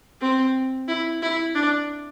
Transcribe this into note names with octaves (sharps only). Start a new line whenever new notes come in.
C4
E4
E4
D4